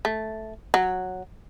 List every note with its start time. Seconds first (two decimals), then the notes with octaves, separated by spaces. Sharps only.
0.05 A3
0.74 F#3